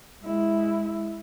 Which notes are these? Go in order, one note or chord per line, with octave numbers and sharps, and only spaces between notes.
G#3 E4